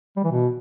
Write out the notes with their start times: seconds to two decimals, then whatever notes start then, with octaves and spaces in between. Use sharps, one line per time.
0.17 G3
0.24 E3
0.31 B2